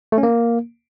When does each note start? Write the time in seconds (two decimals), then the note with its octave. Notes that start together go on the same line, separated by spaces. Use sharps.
0.12 A3
0.18 C#4
0.23 A#3